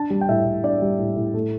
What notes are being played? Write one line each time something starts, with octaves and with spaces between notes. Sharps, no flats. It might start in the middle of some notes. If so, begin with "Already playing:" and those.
Already playing: D4 A5
G3
G5
A2 E5
A2
D4 D5
G3
A2
A2
A3